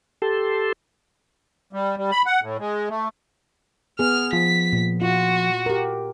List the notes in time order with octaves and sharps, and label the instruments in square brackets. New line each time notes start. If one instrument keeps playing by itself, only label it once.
[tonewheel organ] G4 A4 A5 C6
[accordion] G3
G3
B5
F#5
A2
G#3
A3
[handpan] B3 G#4 [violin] F6
[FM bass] F3 [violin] B6
[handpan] A#2
[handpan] F4 [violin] F#4
[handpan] G4 A#4